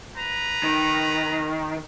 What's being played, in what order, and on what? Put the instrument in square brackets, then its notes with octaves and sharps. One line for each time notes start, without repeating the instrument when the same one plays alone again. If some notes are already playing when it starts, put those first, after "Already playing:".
[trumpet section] B4 A#5
[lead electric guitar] D#3